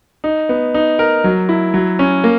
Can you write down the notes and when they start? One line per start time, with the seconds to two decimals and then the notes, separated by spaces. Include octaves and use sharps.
0.24 D#4
0.49 B3
0.74 D#4
0.99 A#4
1.24 F#3
1.49 E4
1.74 F#3
1.99 C#4
2.24 A#3